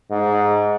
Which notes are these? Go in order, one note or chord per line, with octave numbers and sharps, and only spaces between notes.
G#2